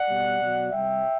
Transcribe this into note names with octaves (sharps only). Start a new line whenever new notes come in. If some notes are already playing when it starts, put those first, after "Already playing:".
Already playing: D5 F#5
B2 G3
B2 F#3
G3 E5 G5
C3